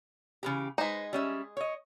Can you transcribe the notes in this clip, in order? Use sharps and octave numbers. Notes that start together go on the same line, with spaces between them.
C#3 E3 G4
G#3 D#4 B4 C5
G3 C#4 E5
C#5 D#5